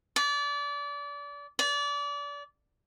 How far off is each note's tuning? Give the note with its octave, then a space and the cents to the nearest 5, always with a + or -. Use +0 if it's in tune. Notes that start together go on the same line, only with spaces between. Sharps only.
D5 -30
D5 -30